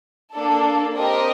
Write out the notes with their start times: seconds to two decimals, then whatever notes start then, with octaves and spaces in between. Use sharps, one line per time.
0.35 A#3 D4 A4
0.97 C4 G4 A#4 D#5